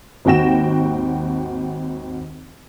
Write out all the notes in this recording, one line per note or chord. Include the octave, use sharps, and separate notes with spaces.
G#1 D#2 F#4 G5 A#6 E7